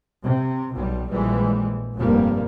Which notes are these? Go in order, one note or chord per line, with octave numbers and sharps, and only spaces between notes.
C3
B1 B2 G3
A#1 E3 G3 G#3
F1 G2 G3 A#3